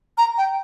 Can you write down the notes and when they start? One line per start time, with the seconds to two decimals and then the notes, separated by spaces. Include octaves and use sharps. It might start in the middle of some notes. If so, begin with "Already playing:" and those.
0.18 A#5
0.38 G5